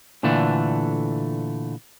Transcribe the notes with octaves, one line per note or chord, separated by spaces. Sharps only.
A#2 D3 E3 A3 D4